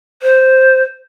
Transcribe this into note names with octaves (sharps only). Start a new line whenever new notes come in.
C5